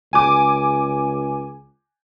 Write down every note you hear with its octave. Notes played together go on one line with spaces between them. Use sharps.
C#2 G#5 D6